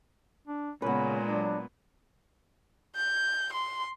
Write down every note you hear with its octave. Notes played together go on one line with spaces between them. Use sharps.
D4
A#2 C#3 G#3 B3 C#4 B4
F#3 D4
G6
C6